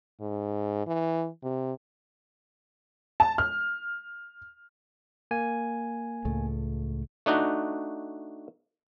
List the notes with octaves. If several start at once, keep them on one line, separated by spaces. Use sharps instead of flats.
G#2
E3
C3
A5
F6
A#3 G#5
C#2 A2 A3
A3 D4 D#4 F#4